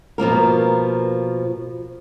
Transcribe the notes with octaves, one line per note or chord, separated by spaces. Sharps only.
B2 F3 A#3 A#4